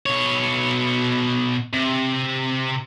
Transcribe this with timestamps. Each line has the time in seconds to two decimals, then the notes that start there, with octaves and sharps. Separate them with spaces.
0.06 B2 C#5
1.73 C3